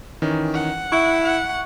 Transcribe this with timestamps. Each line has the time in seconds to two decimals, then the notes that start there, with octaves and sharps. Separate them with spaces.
0.22 D#3 E3 C#4
0.54 F#5
0.92 E4 C#6
1.24 F#5